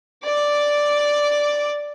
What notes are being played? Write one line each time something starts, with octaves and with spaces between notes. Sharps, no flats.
D5 D6